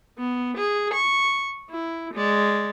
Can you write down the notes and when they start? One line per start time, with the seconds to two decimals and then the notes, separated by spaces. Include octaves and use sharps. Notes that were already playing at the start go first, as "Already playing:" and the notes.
0.18 B3
0.57 G#4
0.93 C#6
1.70 E4
2.14 G#3 D5